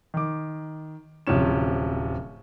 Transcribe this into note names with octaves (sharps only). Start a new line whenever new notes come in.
D#3 D6
D1 C3 F3 C#4 E7